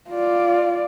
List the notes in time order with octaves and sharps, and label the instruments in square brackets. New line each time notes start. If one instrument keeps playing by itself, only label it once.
[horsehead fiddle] F4 D5